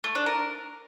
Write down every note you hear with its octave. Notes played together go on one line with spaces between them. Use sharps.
A3
D4
A#4